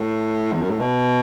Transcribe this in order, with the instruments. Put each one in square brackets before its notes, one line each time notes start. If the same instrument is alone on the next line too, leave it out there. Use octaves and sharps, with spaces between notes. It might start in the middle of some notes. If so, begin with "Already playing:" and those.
Already playing: [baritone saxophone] A2
E2
F#2
A2
B2